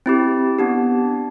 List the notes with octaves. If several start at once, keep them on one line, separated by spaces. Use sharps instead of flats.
C4 E4 G4
B3 D4 G4